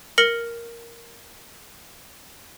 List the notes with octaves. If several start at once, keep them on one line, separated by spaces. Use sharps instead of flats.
A#4 F6 A#6 C#7 F#7